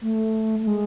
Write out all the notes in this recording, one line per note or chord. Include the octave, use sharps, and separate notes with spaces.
A3
A3
G#3